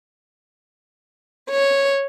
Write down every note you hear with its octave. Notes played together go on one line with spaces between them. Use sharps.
C#5